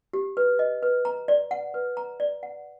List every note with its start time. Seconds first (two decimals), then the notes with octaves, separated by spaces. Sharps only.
0.13 G4
0.37 B4
0.59 D#5
0.83 B4
1.05 A#5
1.28 D5
1.51 F#5
1.74 B4
1.97 A#5
2.20 D5
2.43 F#5